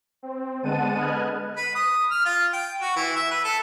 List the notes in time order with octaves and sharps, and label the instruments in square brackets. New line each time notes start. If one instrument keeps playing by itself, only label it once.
[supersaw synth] C4
D3 G#3 B3 F#5 A5 D#7
B4 D#5 F6 F#6 G#6
[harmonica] B4
D#6
F6
F4
G5
F#4
E3
E5
B4
A4